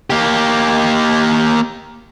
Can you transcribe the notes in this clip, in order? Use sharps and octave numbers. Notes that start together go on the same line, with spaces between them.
A#3 G4